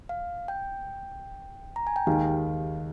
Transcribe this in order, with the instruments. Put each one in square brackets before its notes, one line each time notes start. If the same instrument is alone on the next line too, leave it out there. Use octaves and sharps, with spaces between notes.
[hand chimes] F5
G5
A#5
G#5
G5
[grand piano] D#2 D#3 G#3 D#4 G4 [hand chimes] F5